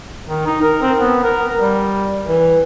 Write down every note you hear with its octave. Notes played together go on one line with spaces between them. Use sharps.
D#3
D#4
A#4
C4
B3
A#4
G3
E3